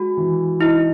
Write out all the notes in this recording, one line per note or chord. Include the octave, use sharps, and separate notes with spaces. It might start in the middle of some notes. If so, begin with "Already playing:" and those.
Already playing: G#3 F#4
E3
D#4 E4